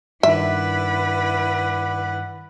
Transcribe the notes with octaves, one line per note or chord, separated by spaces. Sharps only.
G2 D#3 E4 B4 D5 E5 F#5 B5